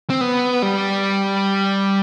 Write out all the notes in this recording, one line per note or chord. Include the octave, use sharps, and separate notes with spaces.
C4
B3
G3